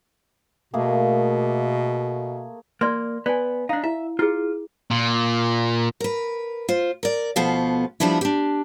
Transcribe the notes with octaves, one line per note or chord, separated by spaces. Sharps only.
B2 A3 A#3 G#4
A#3 D5 C6
B3 D5 G#5
D4 D#4 F5
E4 E5
E4 F4 G#4
A#2
A#4 B4
F4 C5
A#4 D5
D2 B2 F3 B3 A4 F5
F3 G3 B3 D4 E4
D4 G4